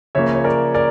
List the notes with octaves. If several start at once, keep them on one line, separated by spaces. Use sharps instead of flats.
C#3 F3 A#3 C#5 E5
C#5
A#4 D5
A#4 D5